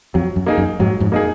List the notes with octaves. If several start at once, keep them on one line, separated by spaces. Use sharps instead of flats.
F2 F#3
F#2
A#3 D#4 G#4
F#2
F2 G#2 F#3
F2 G#2
A#3 D#4 G#4